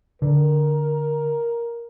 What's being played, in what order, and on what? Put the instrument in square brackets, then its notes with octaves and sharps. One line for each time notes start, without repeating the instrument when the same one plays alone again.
[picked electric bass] D3 [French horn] A#4